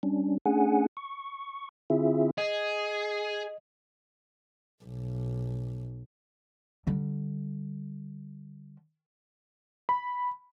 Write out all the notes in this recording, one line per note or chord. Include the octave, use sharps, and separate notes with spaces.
G3 C#4 D4
A3 C#4 D4 G#4 F#5 G#5
C#6
D3 C4 E4 F4 G#4 E5
G#4 D#5
B1
D3 G3
B5